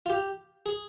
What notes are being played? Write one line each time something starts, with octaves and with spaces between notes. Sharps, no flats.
F4
G4
G#4